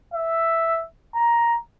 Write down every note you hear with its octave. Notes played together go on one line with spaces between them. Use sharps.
E5
A#5